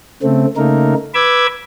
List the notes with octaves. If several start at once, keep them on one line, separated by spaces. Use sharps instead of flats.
C#3 A3 C4
C#3 A3 A#3 D#4 A#4
B4 B5 D6 E6 G#6